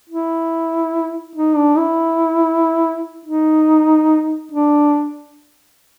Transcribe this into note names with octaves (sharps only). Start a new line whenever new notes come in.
E4
D#4
D4
E4
D#4
D4